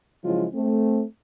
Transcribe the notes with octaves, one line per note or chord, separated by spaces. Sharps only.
C#3 F3 F#3 G#3 E4 F4
A3 C4